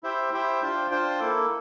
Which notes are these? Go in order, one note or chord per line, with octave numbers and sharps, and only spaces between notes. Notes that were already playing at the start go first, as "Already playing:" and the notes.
E4 G4 C5 E5 G5
E4 G4 C5 E5 G5
D4 F4 C5 G5
D4 F4 C5 G5
A#3 E4 A4